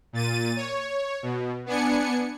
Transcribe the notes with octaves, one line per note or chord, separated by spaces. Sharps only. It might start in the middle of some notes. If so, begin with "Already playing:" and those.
A#2 A6 D#7
C#5
B2
B3 D4 G#5 C#7